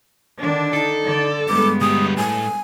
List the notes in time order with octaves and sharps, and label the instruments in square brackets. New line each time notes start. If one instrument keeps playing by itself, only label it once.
[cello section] D3 D#3 D4
[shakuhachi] D#4 [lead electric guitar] A4
[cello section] D3 D5
[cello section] G2 G#3 B3 [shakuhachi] D6
[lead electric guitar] D2 G4 [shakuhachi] D#6
[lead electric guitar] A2 [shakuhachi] G#5